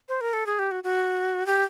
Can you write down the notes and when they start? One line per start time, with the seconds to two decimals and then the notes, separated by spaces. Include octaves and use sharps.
0.09 C5
0.21 A#4
0.33 A4
0.46 G#4
0.59 G4
0.71 F#4
0.84 F#4
1.46 G4